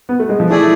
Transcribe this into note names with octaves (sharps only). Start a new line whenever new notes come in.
B3
A3
G#3
F3
E3 A3 E4 G#4 D5